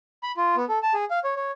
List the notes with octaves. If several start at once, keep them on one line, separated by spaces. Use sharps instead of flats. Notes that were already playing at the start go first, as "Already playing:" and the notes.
B5
F4
B3
A4
A5
G#4
F5
C#5
C#5